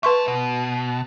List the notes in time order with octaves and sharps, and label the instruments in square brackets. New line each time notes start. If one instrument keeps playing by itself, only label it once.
[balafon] B4 C6 C#6 [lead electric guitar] E5 A5
[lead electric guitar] B2